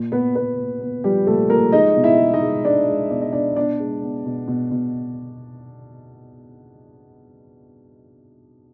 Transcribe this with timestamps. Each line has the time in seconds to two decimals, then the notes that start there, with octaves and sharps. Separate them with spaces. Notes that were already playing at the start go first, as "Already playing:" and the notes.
Already playing: A#2
0.12 A#2 B3 B4
0.35 B3 B4
0.59 A#2
0.81 B3
1.04 F3 G3 G4
1.27 A#2 A3 A4
1.50 F3 A#3 A#4
1.72 G#3 D#4 D#5
1.96 B2
2.04 E4 E5
2.19 G#3
2.34 D#4 D#5
2.42 G#3
2.65 G#3 D4 D5
2.88 G#3
3.10 B2 D5
3.22 D#5
3.32 B2 D4 D5
3.56 B3 D4 D5
3.80 G#3
4.02 B3
4.26 B2
4.48 B2
4.71 B2